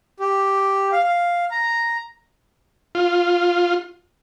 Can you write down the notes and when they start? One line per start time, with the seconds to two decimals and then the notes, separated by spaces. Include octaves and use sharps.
0.20 G4
0.92 F5
1.03 F5
1.51 A#5
2.95 F4